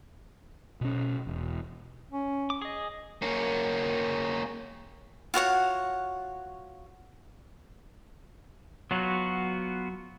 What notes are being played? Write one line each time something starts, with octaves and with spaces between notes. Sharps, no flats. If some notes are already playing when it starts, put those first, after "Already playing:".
B2 C#4
E1
C#4
D6
G#4 D#5
A#3 C#4
F4 F#4 C#5 F#5
F#3 B3 F4 F#4